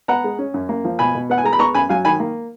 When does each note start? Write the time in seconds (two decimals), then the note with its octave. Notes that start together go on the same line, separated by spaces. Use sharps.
0.08 B3 F#5 A#5
0.24 G#3
0.39 C#4
0.54 F#2
0.69 A#3
0.85 F3
0.99 B2 G#5 B5
1.15 B2
1.30 B3 F#5
1.38 G#5
1.44 G#3 A#5
1.53 B5
1.59 B3 A#5 C#6
1.74 F#2 G#5 B5
1.89 F#3 F5 G#5
2.05 D#3 G#5 B5
2.20 A#3